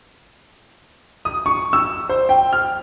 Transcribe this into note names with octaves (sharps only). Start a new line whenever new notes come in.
D#6
C#6
E6
C5
G5
F6